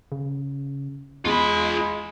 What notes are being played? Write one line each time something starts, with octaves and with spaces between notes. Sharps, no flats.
C#3
E2 G#3 F4 B5